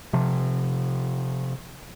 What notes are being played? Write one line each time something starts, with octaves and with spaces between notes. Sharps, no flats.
C3 F3